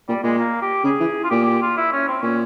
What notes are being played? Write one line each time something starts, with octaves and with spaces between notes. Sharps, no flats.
A#2 G3
A#2 G#3
A#3
G4
C#3 G#4
E3
F4
A#2 G4
G4
F4
E4
C#4
C4
A#2 C#4